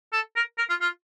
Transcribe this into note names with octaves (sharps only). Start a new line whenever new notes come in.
A4
A#4
A#4
F4
F4